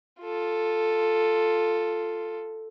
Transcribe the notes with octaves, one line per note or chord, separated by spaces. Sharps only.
F4 A4